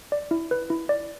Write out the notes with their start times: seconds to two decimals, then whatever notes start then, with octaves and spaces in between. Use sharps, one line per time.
0.12 D5
0.31 E4
0.51 B4
0.70 E4
0.89 D5